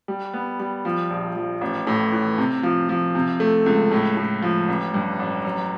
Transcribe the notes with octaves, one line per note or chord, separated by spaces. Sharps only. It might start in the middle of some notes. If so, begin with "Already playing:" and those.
G3
B3
G3
F3
A#1
F3
A1
A2
E3
C3
F3
F3
C3
A3
C#2
A2
A2
F3
A1
G2
A1
F#3